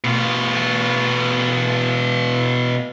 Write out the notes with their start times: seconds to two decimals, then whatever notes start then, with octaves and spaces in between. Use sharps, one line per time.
0.04 B2 F4